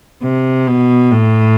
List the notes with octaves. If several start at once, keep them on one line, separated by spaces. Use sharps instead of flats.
C3
B2
A2